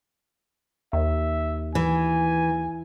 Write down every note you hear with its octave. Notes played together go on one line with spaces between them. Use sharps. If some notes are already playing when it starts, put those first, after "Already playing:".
D#2 E5
E3 G#5